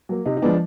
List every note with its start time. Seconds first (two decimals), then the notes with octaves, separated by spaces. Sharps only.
0.09 F#3 A#3
0.26 C3 D#4
0.37 D#4
0.42 F3 G#3 B3 D4